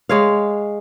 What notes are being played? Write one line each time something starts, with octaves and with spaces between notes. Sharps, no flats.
G#3 C#5 F5